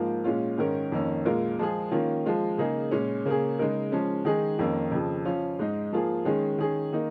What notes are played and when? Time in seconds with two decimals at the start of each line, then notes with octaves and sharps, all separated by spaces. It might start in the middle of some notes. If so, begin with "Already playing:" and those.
Already playing: G#2 F3 A#3 F4
0.24 A#2 G#3 C#4 F4
0.58 G#2 D#3 C#4 A#4
0.92 F2 D#3 A#3 C#4
1.25 A#2 G#3 F4 A#4
1.59 F3 G#3 F4 G#4
1.92 D#3 A#3 C#4 F4
2.26 F3 G#3 F4
2.58 C#3 A#3 D#4 G#4
2.91 A#2 G#3 C#4
3.25 C#3 A#3 C#4 G#4
3.59 C#3 G#3 D#4 A#4
3.92 F3 G#3 C#4
4.25 D#3 G#3 D#4 G#4
4.59 F2 D#3 A#3 C#4
4.92 F2 C#3 F3
5.25 F3 C#4 F4
5.59 G#2 G#3 D#4
5.93 F3 A#3 F4 G#4
6.25 D#3 G#3 C#4 G#4
6.58 D#3 C#4 G#4
6.93 D#3 A#3 D#4